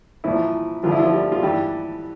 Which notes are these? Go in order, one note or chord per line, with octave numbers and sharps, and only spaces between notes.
C2 A#2 E3 F3 E4
F2 D3 F3 F4
E4
F3 F4
G3 G4
F4
G2 E3 G3 G4